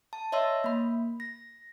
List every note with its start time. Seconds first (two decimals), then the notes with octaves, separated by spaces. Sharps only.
0.13 A5
0.32 C#5 D#5 E5 C6 E6
0.64 A#3 B5
1.20 A#6